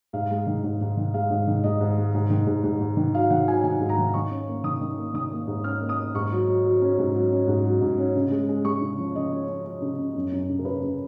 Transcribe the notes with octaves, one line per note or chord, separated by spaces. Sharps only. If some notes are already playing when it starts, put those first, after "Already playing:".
G#2 F5
G#3
D#3
G#2
G#2
D#3
G#3 F5
G#2
D#3
G#2 D#5
G#2
G#3
G#2
D#3
G#2
G#2
G#2
D#3
F#3 F5
D#3 F#5
F#3 G#5
D#3 G#5
G#2
A#5
D#3
D#3 C#6
C#4
A#3
D#3 D#6
D#3
A#3
D#3 D#6
A#3
G#2
C#4 F6
A#3
D#6
A#3
G#2 C#6
F#3
F#3
F#3
C#4
G#2
F#3
C#4
G#2
F#3
G#2
C#4
C#3
G#3
G#3
G#3 C#6
C#3
F3
C#3 D#5
C#4
C#4
C#4
C#3
C#4
F#2
F#2
C#3
A#4
C#3 B4
C#3